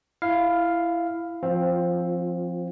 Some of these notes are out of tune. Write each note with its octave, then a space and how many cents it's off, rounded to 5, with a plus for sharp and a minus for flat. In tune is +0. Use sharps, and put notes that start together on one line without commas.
E4 +15 F5 +0
F3 -5 C4 +10 F4 +30